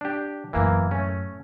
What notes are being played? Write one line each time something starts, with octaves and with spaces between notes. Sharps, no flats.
D4 G4
F#2 A2 E3 A#3
A3 C#4